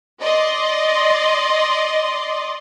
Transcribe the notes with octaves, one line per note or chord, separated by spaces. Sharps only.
D5 D#5 C6